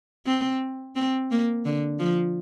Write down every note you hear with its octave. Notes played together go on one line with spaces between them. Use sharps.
C4
C4
A#3
D3
F3